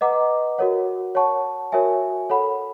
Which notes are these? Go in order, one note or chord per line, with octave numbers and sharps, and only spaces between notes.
B4 D#5 F#5 A#5 D6
F#4 A#4 C#5 F#5
C#5 F#5 A5 C#6
F#4 A#4 C#5 E5 G#5
A4 C#5 F#5 B5